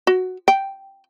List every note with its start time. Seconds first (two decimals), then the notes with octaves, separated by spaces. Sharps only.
0.07 F#4
0.48 G5